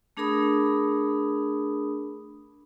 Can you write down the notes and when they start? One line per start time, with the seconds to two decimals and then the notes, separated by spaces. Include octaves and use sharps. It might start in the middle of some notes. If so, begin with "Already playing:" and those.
0.17 A3 D4 G#4 A#4 B5 D#6